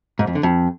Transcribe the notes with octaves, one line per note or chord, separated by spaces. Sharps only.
G#2
F2
D3
F2